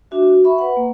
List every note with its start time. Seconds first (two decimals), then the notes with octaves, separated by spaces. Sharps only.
0.11 D4 F#4 E5
0.23 F#4
0.44 E5 B5 C#6
0.58 B4 F#5
0.77 A#3